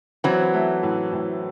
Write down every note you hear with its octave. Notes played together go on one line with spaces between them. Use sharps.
E3 F#3 C4
A3
A2
A2